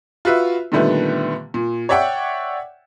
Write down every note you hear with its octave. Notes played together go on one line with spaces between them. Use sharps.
F4 F#4 B4 E5
A#2 D3 D#3 G3 A3 B3
A#2
C#5 D5 E5 F#5 G5 C#6